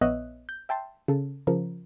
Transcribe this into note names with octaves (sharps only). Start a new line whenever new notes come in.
A#1 B3 C#5 D#5 E5 F#6
G6
E5 G5 A5 C6
C#3 A4
C#3 F3 A#4